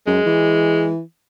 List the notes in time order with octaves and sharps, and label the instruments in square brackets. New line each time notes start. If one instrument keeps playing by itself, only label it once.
[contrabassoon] F#2 [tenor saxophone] G#3
[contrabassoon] E3